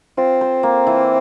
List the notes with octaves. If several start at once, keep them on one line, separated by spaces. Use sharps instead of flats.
C4 F4
C5
A#3
E3